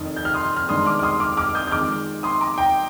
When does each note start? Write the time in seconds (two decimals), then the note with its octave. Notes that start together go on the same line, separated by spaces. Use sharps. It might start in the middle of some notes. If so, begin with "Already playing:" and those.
Already playing: F1 F2 D#3 D#6
0.17 G6
0.25 F6
0.34 C6 D#6
0.57 F6
0.69 G1 G2 D#3 G#3 D4 C6 D#6
0.86 D6 F6
0.99 F6
1.03 C6 D#6
1.20 D6 F6
1.37 D6 F6
1.55 D#6 G6
1.67 G6
1.71 F2 D#3 G#3 D6 F6
2.23 C6 D#6
2.41 A#5 D6
2.58 G5 A#5